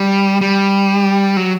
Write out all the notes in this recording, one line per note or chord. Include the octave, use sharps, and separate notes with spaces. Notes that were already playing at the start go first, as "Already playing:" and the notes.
Already playing: G3
G3
F#3